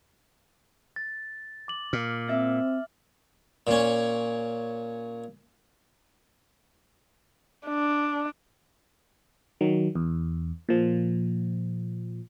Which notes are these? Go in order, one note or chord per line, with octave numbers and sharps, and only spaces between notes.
A6
D6 F#7
A#2 F6
C4 E5 A6 A#6
A#2 C#4
D4
D#3 F#3
E2
A#2 F3